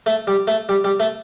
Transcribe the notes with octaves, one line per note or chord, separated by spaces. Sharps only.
A3
G3
A3
G3
G3
A3